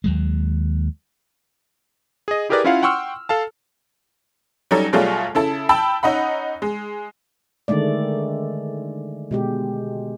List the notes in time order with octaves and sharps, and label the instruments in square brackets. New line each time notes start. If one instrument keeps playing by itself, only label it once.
[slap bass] D#2 F#3 G#3
[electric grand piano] G#4 D#5
E4 G4 G#4 A#4 B4 D5
C#4 E4 F4 C#5 F5 F#5
F#5 G5 C6 C#6 E6 F6
A4 F5 A5
[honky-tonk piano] F#3 G3 C#4 D#4 A4
B2 F#3 G3 A3 F4 G#4
C#3 E4 A4 A5
G5 A5 B5 E6
C#4 D#4 D#5 F#5 B5
G#3
[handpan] D3 D#3 G#3 A3 D5
B2 G#3 G4